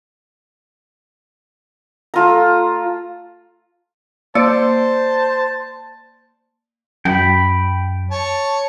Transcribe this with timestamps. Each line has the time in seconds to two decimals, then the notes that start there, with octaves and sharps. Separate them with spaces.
2.14 A3 F4 A#5
4.35 A#3 C5 D5 A5
7.05 F#2 G5 B5
8.11 C#5 A5